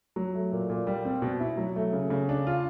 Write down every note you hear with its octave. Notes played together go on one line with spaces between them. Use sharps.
F#3
A3
A#2
A#2
G3
C4
B2
E4
F#3
A3
C#3
C#3
D4
F4